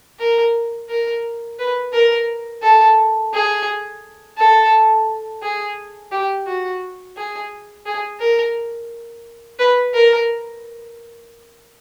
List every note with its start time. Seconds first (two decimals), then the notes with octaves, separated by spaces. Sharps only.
0.19 A#4
0.89 A#4
1.58 B4
1.93 A#4
2.62 A4
3.33 G#4
4.37 A4
5.42 G#4
6.11 G4
6.46 F#4
7.16 G#4
7.86 G#4
8.19 A#4
9.59 B4
9.94 A#4